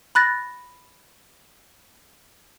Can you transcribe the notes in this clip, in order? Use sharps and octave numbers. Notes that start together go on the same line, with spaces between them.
B5 F#6 A6 A#6